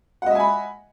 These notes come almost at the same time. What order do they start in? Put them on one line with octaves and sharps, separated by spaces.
F#5 D#5 E5 G#5 B5